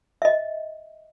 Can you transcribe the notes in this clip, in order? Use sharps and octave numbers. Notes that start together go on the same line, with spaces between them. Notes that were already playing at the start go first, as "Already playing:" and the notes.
D#5 E5